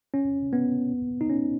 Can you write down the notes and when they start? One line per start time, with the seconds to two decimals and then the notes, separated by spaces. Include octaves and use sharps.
0.14 C#4
0.53 B3
1.21 D#4
1.30 C#4